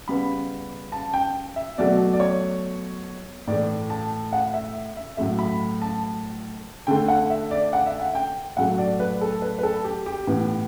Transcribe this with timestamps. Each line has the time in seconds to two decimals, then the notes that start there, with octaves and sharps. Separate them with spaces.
0.08 C#3 G3 B3 B5
0.92 A5
1.14 G5
1.56 E5
1.78 B2 F#3 A3 D5
2.13 D5
2.20 C#5
3.47 A2 E3 A3 D5
3.90 A5
4.33 F#5
4.54 E5
4.97 E5
5.17 A2 F#3 A3 E5
5.39 B5
5.81 A5
6.87 D3 A3 G5
7.08 F#5
7.30 E5
7.51 D5
7.73 F#5
7.86 E5
8.00 F#5
8.15 G5
8.57 A2 F#3 A3 F#5
8.78 D5
9.00 B4
9.21 A4
9.42 B4
9.59 B4
9.63 A4
9.84 G4
10.06 G4
10.27 A2 E3 B3